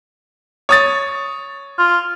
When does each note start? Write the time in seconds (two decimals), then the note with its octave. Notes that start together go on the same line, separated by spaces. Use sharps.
0.69 C#5 D#6 A6
1.78 F4